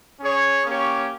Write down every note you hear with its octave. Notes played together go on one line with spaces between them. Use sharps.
C#4 G#4 C#5
A#3 C#4 G4 C#5